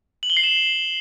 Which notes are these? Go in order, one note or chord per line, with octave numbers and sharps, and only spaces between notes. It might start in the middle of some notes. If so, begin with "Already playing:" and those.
F#7
G7
C7
E7